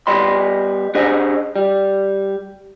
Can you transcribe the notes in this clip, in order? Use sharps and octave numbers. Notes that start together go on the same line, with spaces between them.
G3 B3 D#5 B5 C6
D4 G4 G#4 C5 D#5
G3